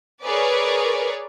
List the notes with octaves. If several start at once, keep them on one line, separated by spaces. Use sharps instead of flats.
G#4 A#4 B4 C#5 D5